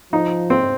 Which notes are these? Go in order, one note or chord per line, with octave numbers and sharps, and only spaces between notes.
F3 D#4
C4